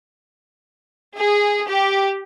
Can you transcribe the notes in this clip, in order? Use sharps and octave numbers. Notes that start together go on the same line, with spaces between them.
G#4
G4